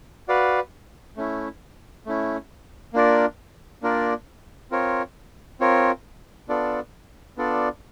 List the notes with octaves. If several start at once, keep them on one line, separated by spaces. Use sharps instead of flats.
F#4 B4 D5 F5
A3 C#4 E4
A3 C#4 E4
A#3 D4 F4 A#4 D5
A#3 D4 F4 A#4 D5
C4 F4 A#4 C#5
C4 F4 A#4 C#5
B3 D4 F4 A4 D5
B3 D4 F4 A4 D5